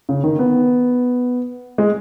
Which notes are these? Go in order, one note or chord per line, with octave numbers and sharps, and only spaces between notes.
C#3
D#3
B3
G#3